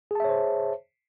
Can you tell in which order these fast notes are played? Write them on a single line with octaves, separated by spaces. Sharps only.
G#4 A5 E5 C#5 C5